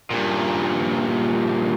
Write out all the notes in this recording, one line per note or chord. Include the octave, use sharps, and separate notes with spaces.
G2 A#2